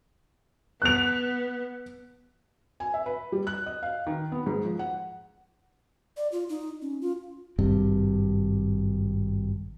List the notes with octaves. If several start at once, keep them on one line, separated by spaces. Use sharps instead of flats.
B3 F#6 F7
G#5
E5
B4
G3
F#6
D#5
F5
D#3
B3
G#2
F3
F#5
D5
F4
D#4
C#4
F4
G#1 G2 C3